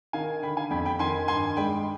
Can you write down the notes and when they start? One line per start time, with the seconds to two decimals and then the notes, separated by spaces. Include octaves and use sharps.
0.13 D#3 F5 G#5
0.42 D3 G5 B5
0.57 F5 G#5
0.71 F2 G5 B5
0.85 G5 B5
0.99 D#3 G#5 C6
1.28 G2 G#5 C6
1.57 G#3 G5 B5